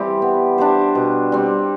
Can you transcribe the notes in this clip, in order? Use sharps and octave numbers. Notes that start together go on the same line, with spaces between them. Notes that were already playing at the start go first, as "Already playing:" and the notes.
Already playing: E3 G3 C4 E4 G4
B3
D4 G4 C5
B2
G3 C4